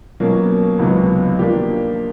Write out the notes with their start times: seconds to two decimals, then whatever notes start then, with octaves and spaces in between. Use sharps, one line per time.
0.20 B2 F#3 A#3 C#4
0.79 C#2 C3 D#3 F#3 B3
1.39 F3 A#3 D4 G4